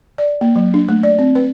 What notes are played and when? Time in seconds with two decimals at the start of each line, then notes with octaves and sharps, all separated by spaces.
0.18 D5
0.41 A#3
0.56 F#3
0.74 D4
0.88 A3
1.03 D5
1.19 C4
1.35 B4